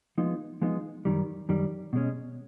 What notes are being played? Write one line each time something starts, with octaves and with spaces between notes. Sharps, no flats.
F3 G#3 B3 D#4
F3 G#3 B3 D#4
F#2 D#3 G3
F#2 D#3 G3
B2 G#3 C#4